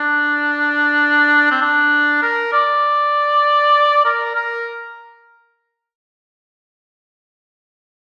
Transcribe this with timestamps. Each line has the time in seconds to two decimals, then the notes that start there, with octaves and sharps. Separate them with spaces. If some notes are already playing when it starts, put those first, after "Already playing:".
Already playing: D4
1.51 C4
1.62 D4
2.22 A#4
2.52 D5
4.05 A#4
4.35 A#4